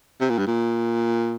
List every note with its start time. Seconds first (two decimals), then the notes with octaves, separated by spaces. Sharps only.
0.21 C3
0.29 A#2
0.38 G2
0.47 A#2